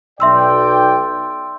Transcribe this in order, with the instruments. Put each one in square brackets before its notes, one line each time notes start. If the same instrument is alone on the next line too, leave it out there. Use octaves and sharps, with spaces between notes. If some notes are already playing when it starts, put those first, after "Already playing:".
[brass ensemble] B1 D5 G5 [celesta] E5 C6 E6